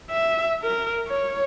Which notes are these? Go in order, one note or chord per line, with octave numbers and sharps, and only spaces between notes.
E5
A#4
C#5